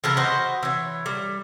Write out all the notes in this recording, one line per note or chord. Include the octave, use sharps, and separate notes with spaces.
C#3 E3 A4 A#4
F#4 B4 C5 D#5
E3 C#5
G3